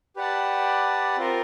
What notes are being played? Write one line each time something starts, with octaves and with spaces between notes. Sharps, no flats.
G4 B4 D5 F#5 A5
C4 F4 A#4